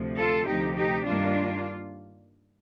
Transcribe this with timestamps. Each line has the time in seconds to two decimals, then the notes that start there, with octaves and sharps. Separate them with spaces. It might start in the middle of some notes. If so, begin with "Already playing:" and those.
Already playing: D2 C3 F3
0.17 F4 A4
0.45 D2 C3 F3 A3 D#4 G4
0.75 D#4 G4
1.04 G2 D#3 G3 A#3 D4 F4